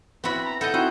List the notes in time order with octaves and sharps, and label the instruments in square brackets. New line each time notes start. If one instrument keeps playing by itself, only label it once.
[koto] B3 F#4 [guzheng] C4 E4 [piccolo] B5
[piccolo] A#5
[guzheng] E4 F#5 [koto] A4 D#5 [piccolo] G6
[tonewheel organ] C4 E4 F#4 [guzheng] D#4